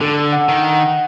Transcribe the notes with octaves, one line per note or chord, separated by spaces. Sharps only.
D3 A4
F#5
D#3
F#5